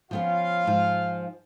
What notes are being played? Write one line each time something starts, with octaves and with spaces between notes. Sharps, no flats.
F3 B3 C#4 F4 F5
G#2 F3